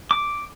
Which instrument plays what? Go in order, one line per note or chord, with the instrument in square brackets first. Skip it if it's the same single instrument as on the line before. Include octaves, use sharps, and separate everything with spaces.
[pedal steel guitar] D6